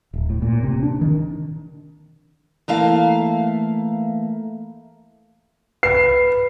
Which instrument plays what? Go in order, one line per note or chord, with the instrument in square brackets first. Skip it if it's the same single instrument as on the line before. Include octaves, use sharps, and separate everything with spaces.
[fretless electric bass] D1
A2
A#2
C3
D4
D#3
[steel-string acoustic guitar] E3 A3 A#3 F5
[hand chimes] B4 [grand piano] C7